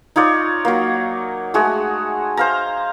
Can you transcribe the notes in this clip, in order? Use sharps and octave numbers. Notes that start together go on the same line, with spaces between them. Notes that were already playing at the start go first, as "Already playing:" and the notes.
D#4 F4 C#5 D5
F#3 A#3
G#3 A3 F#4 G#4
C5 F5 A#5